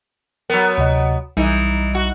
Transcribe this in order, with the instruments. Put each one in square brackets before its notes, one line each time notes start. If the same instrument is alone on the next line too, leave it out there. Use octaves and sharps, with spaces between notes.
[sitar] F#3 B3 [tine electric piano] A#4
[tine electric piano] D2 C3 D#5
[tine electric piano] B1 G3 [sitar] E3 D#4
[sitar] F#4